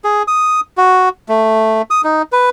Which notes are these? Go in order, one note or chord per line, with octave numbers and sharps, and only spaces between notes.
G#4
D#6
F#4
A3
D#6
D#4
B4